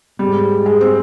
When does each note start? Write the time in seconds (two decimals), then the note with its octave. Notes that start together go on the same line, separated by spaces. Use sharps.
0.19 G#2 G3
0.66 G#3
0.81 C4